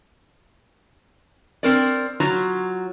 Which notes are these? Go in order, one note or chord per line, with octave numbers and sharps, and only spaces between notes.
C4 A#4 D5
F#3 F4 A#5